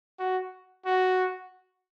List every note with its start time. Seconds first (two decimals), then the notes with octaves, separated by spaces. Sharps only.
0.19 F#4
0.85 F#4